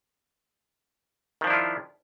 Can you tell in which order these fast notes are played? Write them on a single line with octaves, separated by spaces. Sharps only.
D#3 F3 D4 E4 F4